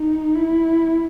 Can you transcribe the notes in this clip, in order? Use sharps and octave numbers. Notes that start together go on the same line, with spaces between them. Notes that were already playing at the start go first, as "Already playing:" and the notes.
Already playing: D#4
E4